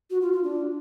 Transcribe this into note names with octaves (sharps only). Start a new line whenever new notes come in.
F#4
F4
F4
D4